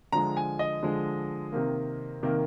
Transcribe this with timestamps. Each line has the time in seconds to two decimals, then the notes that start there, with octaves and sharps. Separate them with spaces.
0.12 D3 F3 G#3 A#5
0.37 G#5
0.59 D#5
0.83 D3 F3 G#3
1.52 C3 D#3 A#3
2.23 C3 D#3 A#3